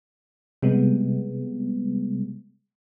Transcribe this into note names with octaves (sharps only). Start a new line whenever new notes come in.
C3 G3 G#3 B3